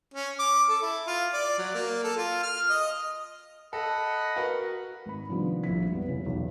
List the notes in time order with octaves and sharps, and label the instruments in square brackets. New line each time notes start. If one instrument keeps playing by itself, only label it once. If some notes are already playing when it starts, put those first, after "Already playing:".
[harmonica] C#4
D6
A4
E4
F4
D5
F#3
A#3
A4
F4
F6
D#5
[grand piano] A4 [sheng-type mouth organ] D#5 F#5 B5
[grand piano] F#4 A#4 B4
[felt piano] G#1 B5
C3 D#3 F3 G3 B3 D4
A#1 F2 E4 B6
G3 G#3 B3
C#3 F#3 E4
B1 E2